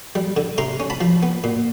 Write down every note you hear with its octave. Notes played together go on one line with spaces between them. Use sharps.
G3
D3
C3 A#5 C6
C#4
A5 B5
F3
B3
A#2